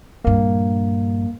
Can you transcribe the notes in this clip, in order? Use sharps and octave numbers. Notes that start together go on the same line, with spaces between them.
A#1 G2 A#3